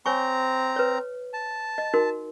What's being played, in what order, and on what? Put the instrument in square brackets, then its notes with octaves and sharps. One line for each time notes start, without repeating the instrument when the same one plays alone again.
[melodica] C4 A#5 [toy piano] C#5 G#5 C#6
[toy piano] B4 C#5
[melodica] A5
[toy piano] D#5
D#4 F#4 A#4